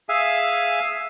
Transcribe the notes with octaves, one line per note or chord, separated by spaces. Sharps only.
G#4 E5 F5 G#5